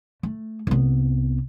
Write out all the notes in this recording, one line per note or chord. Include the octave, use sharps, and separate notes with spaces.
A3
C2 B3